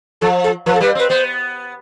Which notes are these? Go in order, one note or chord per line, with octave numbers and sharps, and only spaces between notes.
F3 A4
A4
F3 B4
A4
G3 B4
C4 B4
B3 C5